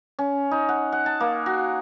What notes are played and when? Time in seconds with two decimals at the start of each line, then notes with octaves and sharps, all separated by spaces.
0.19 C#4
0.51 D#4
0.69 F#5
0.92 F#5
1.06 A5
1.20 A#3
1.46 F#4